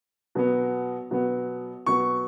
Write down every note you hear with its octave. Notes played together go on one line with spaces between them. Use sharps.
B2 F#3 B3
B2 F#3 B3
B2 F#3 B3 C#6